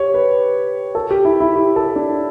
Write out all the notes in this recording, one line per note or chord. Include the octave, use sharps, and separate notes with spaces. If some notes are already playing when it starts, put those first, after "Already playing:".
Already playing: G4 C#5
B4
A4
G4
E4
E4
G4
A4
D4